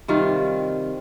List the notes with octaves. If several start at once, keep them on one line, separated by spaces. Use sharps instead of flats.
C3 D#3 G3 F4